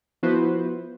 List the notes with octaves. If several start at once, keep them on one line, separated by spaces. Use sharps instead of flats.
F3 B3 E4 F#4 B4 C5